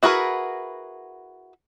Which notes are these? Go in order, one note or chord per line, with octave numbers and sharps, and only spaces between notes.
E4 F#4 G#4 A#4 B4